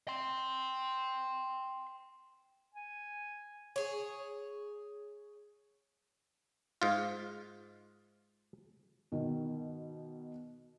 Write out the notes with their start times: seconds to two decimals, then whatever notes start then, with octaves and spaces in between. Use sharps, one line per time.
0.08 G5 C6
2.75 G#5
3.76 G#4 C#5
6.82 G#2 F4
9.12 B2 D#3